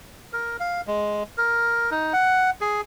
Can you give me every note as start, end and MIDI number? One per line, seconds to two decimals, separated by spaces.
0.33 0.57 70
0.60 0.81 77
0.87 1.23 56
1.38 1.90 70
1.91 2.13 63
2.13 2.50 78
2.61 2.81 68